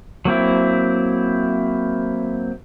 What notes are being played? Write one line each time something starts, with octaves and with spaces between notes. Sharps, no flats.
F#3 A#3 C4 E4